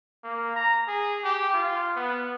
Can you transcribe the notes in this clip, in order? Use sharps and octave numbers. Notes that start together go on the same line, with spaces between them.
A#3
A#5
G#4
G4
F4
B3